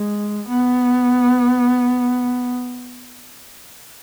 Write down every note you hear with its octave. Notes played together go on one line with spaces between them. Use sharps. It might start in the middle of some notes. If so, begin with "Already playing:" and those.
Already playing: G#3
B3